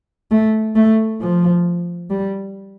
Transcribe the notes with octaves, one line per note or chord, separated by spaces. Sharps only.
A3
A3
F3
G3